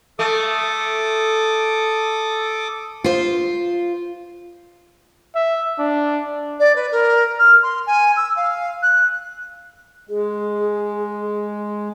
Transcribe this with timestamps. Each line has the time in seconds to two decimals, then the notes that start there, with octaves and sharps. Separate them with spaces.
0.19 A3 A4 D6 D#6
3.04 F4 C5
5.35 E5
5.78 D4
6.59 D5
6.75 B4
6.92 A#4
7.39 F6
7.63 C6
7.87 G#5
8.16 E6
8.36 F5
8.82 F#6
10.09 G#3 G#4